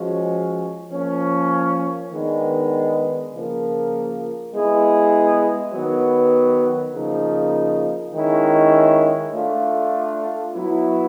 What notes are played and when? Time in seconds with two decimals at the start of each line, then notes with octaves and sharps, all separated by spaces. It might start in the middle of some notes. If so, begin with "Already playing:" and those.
Already playing: F3 G#3 C#4 F#4
0.92 F3 A#3 C#4
2.12 D#3 G#3 B3 D4
3.33 C#3 F3 A#3
4.53 G#3 B3 E4 G#4
5.73 D#3 F#3 B3
6.94 C#3 F3 A#3 D#4
8.13 D#3 G#3 C#4 E4
9.33 A3 D4 F4
10.55 F#3 B3 E4